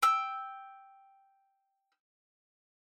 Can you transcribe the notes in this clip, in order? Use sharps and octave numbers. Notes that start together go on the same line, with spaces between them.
G5 E6